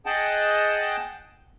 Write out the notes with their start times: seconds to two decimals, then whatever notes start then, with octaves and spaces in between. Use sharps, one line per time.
0.06 G#4 D#5 F#5 G5 A5